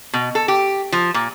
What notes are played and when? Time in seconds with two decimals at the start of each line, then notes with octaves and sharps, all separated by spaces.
0.13 B2
0.35 A4
0.48 G4
0.92 F3
1.14 A#2